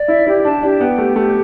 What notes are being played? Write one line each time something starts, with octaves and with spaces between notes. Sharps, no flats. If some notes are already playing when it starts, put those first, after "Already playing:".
Already playing: D5
E4 E5
E4 G4
D4 A5
D4 G4
B3 G5
A3 G4
A3 G4